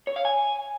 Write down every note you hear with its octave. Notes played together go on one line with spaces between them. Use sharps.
C#5
F5
G#5